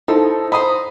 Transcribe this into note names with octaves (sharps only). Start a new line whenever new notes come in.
F3 D#4 E4 A4
D#4 C5 B5 D#6